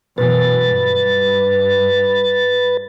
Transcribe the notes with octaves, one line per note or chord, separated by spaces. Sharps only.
F#2 B2 E3 B4 A6
G2